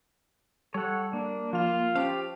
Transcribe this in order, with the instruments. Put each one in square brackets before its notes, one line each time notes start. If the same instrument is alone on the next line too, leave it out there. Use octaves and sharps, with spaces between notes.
[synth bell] G3 [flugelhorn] A4 [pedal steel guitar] C#5 F#5
[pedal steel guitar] A#3 [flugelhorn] D4
[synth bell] F3 F7 [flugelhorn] F4
[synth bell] C#4 C5 A5 [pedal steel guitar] G4 F5